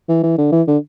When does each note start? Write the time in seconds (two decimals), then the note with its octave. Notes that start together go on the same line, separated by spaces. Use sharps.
0.09 E3
0.23 E3
0.38 D3
0.52 E3
0.67 D3